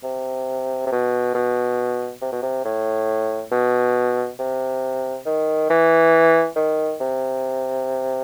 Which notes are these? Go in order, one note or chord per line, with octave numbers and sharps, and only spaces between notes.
C3
C3
B2
B2
C3
B2
C3
A2
B2
C3
D#3
E3
D#3
C3